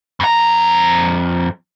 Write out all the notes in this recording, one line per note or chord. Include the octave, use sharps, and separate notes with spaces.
F2 A#5